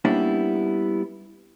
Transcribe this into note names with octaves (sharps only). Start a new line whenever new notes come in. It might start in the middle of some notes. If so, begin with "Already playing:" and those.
G3 A#3 B3 C#4 D4 E4